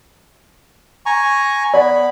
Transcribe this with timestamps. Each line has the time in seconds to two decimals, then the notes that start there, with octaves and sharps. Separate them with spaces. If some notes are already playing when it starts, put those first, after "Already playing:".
1.06 G#5 A#5 C#6
1.74 B3 D5 B5